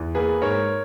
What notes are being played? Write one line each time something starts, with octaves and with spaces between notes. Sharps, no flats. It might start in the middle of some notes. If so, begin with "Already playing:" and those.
Already playing: E2
A#3 G#4 B4
G#2 A#4 C#5